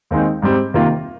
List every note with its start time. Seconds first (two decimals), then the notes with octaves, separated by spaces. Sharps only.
0.11 D#2 D#3 G#3 C4 D#4
0.42 G#2 G3 C4 G4
0.74 C3 D#3 A#3 F4